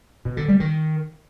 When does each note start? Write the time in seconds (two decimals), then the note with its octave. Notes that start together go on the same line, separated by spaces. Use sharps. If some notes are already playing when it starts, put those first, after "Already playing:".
0.25 B2
0.37 D3
0.48 G3
0.60 D#3